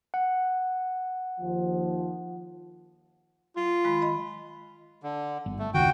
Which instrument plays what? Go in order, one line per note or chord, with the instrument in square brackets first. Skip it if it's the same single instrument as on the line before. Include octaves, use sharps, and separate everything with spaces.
[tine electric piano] F#5
[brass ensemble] D#2 F3
[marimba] F#3 [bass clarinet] F4
[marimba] D#3 G#3 B5
D#5 B5
[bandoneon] D3
[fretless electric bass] G1
[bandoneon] A3
[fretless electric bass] F1 C#2 D#3 [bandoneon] F#4 G5